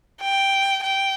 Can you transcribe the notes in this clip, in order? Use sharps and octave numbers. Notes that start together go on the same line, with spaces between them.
G5
G5